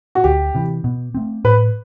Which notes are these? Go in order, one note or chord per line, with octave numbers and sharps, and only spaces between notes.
F#4
D2 G4
C3 E3
B2
A3 C4
A2 B4